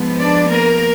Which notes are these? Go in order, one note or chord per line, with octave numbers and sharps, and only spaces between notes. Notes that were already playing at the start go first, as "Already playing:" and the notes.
Already playing: G#2 F3 B3
D4 D5
A#3 A#4